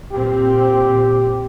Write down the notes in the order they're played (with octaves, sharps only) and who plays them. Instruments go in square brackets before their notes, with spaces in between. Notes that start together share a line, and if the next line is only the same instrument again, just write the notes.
[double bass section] A#2 C4 [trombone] G4